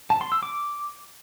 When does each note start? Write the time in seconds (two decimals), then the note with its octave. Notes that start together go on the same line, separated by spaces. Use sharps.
0.10 A5
0.21 C6
0.32 E6
0.43 D6